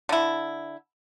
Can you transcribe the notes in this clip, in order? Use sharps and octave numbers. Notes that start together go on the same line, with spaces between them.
D3 E4